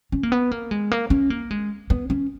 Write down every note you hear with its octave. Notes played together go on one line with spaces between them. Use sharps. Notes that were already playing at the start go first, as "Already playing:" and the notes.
C#4
A#3
B3
A#3
G#3
A#3
C#4
A#3
G#3
B3
C#4